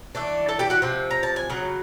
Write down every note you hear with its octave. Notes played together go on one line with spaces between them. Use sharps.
E3 A3 D4
A4 A5
G4 G5
F#4 F#5
C3 F3
A#5
A5
G#5
C#3 F#3